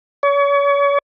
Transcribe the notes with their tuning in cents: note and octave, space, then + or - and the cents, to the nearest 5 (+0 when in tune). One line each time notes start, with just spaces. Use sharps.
C#5 +35